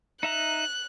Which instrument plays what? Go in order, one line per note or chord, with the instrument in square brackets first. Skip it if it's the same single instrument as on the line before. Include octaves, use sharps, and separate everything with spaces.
[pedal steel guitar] D#4 E5 A#5 [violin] F#6